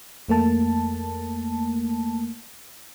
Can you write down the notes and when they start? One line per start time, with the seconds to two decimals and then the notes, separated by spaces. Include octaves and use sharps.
0.28 F2 A3 A#3 A5